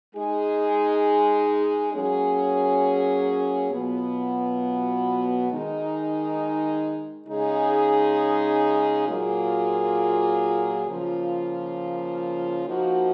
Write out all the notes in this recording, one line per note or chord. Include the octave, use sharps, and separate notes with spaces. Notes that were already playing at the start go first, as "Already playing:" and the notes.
G#3 D#4 G#4
F#3 A#3 C#4 G#4
B2 F#3 B3 F4
D#3 G#3 D#4 G#4
C#3 G#3 D#4 G#4
A#2 F#3 A#3 F4 G#4
C#3 F3 A#3 F4
F3 A#3 D#4 F#4